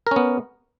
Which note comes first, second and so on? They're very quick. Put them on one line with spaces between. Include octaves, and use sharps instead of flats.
A#4 C#4 B3